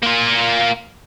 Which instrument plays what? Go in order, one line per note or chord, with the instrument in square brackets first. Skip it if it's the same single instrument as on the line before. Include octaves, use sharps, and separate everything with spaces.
[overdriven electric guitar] A#3 F4